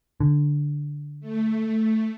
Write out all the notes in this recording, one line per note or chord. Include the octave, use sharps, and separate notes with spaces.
D3
A3